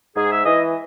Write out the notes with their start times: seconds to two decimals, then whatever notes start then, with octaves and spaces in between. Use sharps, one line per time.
0.16 G#2 G#4
0.31 E5
0.45 E3 D#5